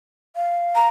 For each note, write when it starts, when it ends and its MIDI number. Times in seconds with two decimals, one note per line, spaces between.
0.36 0.87 77
0.75 0.88 82